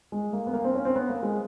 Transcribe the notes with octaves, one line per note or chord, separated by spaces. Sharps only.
G#3
A#3
B3
A#3
C4
C#4
C4
B3
A#3
G#3